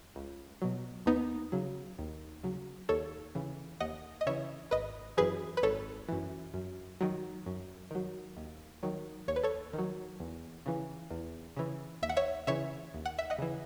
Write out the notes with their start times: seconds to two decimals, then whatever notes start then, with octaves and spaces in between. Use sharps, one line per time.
0.16 C#2
0.62 B2 F#3
1.06 D#2 B3 D#4
1.52 C#3 F#3
1.99 D#2
2.43 C#3 F#3
2.89 D#2 A4 C#5
3.35 C#3 E3
3.80 D#2 D#5 F#5
4.21 D#5
4.26 C#3 E3 C#5 E5
4.71 G#1 B4 D#5
5.17 F#2 E3 G#4 B4
5.57 B4
5.63 G#1 A4 C#5
6.09 F#2 E3
6.54 F#2
7.01 D#3 F#3
7.46 F#2
7.91 D#3 F#3
8.37 D#2
8.83 D#3 F#3
9.28 D#2 C#5
9.36 B4
9.43 A4 C#5
9.73 D#3
9.78 F#3
10.20 E2
10.66 C#3 E3
11.11 E2
11.57 C#3 E3
12.03 D#2 E5
12.09 F#5
12.17 C#5 E5
12.47 C#3 E3 C#5 E5
12.94 D#2
13.05 F#5
13.19 E5
13.30 D#5 F#5
13.38 C#3 E3